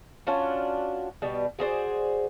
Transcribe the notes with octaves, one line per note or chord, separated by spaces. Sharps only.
C#4 D4 F4 F#4
B2 G3 B3
F#4 G#4 C5 D5